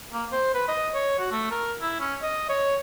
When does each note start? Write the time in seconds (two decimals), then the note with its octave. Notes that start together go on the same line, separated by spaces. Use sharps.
0.13 A#3
0.32 C5
0.54 B4
0.68 D#5
0.94 C#5
1.19 F#4
1.31 A3
1.51 A#4
1.81 E4
2.00 C#4
2.22 D#5
2.49 C#5